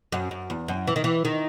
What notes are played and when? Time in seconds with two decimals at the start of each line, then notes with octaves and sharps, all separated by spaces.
0.12 F#2
0.31 F#2
0.50 E2
0.68 F#2
0.87 E3
0.96 D#3
1.04 E3
1.25 D#3